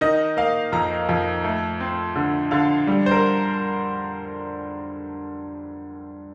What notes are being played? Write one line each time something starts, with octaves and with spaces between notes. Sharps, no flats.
D#3 D#5
A#3 F5
F2 A#5
F2
A3
C4
D3
D3 F5
G3
C5
A#4